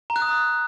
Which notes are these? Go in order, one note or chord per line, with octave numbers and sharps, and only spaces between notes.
A#5
F#6
D#6